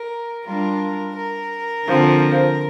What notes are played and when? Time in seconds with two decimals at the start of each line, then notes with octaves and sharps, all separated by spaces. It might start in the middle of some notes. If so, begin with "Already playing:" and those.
Already playing: A#4
0.46 G3 D4 F4 A#4
1.15 A#4
1.85 D3 F3 C4